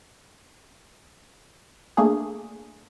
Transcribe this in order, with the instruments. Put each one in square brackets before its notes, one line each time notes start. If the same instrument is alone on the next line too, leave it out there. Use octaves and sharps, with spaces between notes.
[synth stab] A3 A#3 D4 G#4